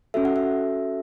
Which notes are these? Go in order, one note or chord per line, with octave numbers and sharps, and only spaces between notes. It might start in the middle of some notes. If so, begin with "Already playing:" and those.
C#4 F#4 A4 E5
F#5
E5